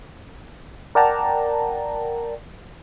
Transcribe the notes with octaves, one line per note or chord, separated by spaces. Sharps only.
A#4 D5 F#5 G5 A5 A#5